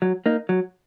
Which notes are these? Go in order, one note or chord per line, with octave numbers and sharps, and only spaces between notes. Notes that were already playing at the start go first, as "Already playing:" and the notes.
F#3
A#3 D#4
F#3